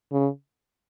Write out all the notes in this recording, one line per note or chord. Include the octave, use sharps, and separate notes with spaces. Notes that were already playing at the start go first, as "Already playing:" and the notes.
C#3